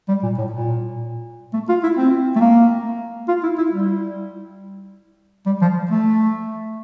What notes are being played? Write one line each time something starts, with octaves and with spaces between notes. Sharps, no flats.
G3
A#2
A2
A#2
A3
F4
E4
C4
A3
A#3
F4
E4
E4
G3
G3
F3
A3